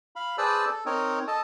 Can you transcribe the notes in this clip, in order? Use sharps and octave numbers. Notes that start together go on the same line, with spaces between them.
F5 B5
G#4 B4 C5 D5 A5 E6
A4
C4 D#4 A#4 C#5 D#5
A4 D#5 A5